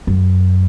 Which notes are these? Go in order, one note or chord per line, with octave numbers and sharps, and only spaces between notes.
F#2